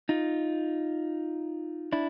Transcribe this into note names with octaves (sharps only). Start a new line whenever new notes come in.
D#4 F4
D4 E4